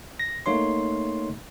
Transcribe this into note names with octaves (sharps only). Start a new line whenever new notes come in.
A#6
A3 A#3 D#4 C#5 C6